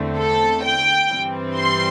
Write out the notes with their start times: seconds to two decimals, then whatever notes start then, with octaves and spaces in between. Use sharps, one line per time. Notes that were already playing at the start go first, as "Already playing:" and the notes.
Already playing: E2 D3 A3 C4
0.17 A4
0.64 G5
1.10 G2 E3 G3 C4
1.57 C6